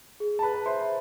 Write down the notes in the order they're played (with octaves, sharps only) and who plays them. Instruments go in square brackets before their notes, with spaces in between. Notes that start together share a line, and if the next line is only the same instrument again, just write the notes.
[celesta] G#4
[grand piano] A5
B4 B5
[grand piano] C5 C6 [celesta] E5